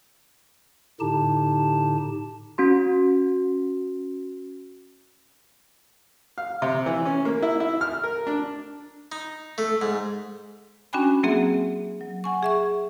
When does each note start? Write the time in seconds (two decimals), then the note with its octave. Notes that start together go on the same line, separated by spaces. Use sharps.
1.00 A2 D3 D#4 G4 A5
2.58 C#4 F#4 C6
6.38 F5
6.62 C3
6.86 E3
7.05 C#4
7.25 A#3
7.42 E4
7.60 E4
7.81 F6
8.04 A#4
8.27 D4
9.12 D#4
9.58 A3
9.82 G#2
10.93 C#4 D4 F#4 G5 G#5 B5
11.23 F#3 A#3 C4 G#4 E5
12.01 F#3
12.24 F#5 G#5 C#6
12.43 G#4 E5 C#6